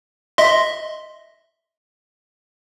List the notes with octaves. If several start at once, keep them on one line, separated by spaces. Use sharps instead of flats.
D#5 E5 C6